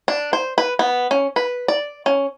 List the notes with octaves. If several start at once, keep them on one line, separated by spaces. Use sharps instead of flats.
D4
C5
B4
B3
C#4
B4
D5
C#4